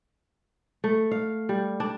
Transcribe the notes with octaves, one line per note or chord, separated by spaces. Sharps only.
A3
F5
G3
D4